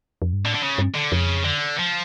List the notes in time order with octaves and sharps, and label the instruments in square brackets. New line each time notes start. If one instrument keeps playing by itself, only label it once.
[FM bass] F2
G2
[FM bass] A2 [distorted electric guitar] D3
[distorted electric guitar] D3
C#3
[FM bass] G2
[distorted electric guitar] D3
[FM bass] F2 [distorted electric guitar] C#3
[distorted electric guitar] D3
F3